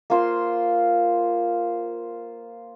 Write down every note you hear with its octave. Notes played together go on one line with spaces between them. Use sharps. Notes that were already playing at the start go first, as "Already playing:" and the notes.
A#3 F4 C5